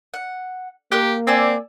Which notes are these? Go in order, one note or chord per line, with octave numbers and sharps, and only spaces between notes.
F#5
A#3 G4 A#4 C6 F#6
C4 D5 G#5 E6